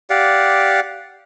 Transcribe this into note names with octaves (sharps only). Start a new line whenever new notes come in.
G4 D5 F5 F#5